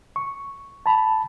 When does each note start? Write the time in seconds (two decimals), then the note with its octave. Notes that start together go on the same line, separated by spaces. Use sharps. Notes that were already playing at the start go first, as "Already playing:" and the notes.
0.16 C#6
0.86 A5 B5